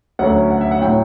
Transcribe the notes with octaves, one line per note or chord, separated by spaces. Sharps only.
D2 D3 F#3 C#4 F#5
F#5
E5
F#5
A2 F#3 G5